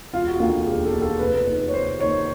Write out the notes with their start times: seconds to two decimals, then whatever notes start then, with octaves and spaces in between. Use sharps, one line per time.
0.13 E1 F4
0.27 F#4
0.40 D#2 D3 F4
0.67 E1 G4
0.85 A4
0.93 D#2 D3
1.02 A4
1.19 F1 B4
1.47 D#2 D#3
1.68 C#5
1.74 F1 C5
2.00 D#2 D#3 C#5